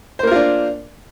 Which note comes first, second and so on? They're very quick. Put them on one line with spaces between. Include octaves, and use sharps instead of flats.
C5 A#3 A#4 F4 D4